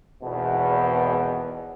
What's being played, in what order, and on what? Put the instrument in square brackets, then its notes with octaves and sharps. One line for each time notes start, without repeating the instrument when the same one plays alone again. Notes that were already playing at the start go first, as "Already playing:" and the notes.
[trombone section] G#1 E2 B2